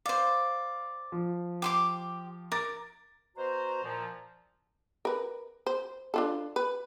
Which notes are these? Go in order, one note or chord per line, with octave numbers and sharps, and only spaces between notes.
C5 D5 F5
F3
G4 C6 D6
A#4 D6 A6
B2 F#4 C5 A#5
A#2 F3
A#4 B4
C5
D4 F4 A4
B4